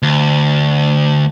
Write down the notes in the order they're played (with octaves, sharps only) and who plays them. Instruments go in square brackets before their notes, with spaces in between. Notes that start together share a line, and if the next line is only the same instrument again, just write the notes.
[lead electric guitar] D2